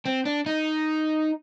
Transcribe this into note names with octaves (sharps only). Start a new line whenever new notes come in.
C4
D4
D#4